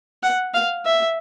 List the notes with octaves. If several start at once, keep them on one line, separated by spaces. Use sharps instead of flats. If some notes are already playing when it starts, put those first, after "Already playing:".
F#5
F5
E5